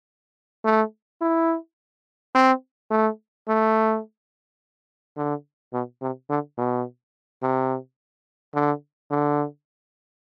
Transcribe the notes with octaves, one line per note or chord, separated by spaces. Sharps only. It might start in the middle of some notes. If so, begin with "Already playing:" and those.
A3
E4
C4
A3
A3
D3
B2
C3
D3
B2
C3
D3
D3